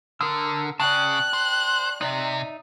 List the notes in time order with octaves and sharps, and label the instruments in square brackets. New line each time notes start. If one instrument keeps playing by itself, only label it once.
[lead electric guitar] D3 [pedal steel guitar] A#4 D#6 E6
[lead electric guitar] C#3 [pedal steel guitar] D5 G5 A5 [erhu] F#6
[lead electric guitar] C5
[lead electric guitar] C3 [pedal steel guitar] D#4 D5 E5